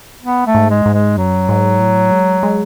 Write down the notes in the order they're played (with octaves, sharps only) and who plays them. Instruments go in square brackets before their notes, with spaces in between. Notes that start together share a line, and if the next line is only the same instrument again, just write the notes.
[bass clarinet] B3
A3
[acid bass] G#2
[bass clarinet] G#3
[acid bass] G#2
[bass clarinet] G#3
[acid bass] F#2 [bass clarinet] F#3
[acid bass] G#2
A2
G#3
G#3